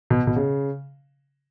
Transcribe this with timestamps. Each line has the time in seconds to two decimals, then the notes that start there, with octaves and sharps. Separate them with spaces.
0.10 B2
0.27 B2
0.36 C#3